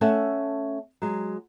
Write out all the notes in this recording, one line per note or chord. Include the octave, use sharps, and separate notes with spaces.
A3 C#4 A4 E5 F#5
F#3 G#3